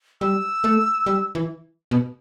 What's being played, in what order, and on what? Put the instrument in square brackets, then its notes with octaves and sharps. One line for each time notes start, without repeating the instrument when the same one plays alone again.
[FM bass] G3 [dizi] E6
[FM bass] A3
G3
E3
B2